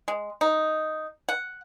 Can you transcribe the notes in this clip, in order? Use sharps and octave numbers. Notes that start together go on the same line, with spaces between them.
G#3
D#4
F#5